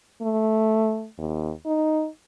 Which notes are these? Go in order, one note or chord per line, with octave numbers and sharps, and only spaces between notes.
A3
D#2
D#4